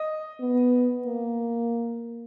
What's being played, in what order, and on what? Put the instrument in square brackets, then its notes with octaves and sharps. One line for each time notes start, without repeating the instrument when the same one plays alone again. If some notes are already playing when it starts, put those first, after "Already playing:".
Already playing: [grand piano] D#5
[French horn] B3
A#3